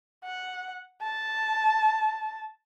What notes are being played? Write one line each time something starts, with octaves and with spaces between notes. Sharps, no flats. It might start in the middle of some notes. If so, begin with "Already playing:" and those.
F#5
A5